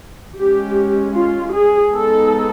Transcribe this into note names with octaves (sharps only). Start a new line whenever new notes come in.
G#3 C#4 G4
F4
G#4
G#3 B3 D#4 A4